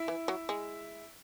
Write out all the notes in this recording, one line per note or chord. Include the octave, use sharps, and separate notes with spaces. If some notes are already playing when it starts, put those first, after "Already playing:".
Already playing: E4 E5
E3
F#3
G#3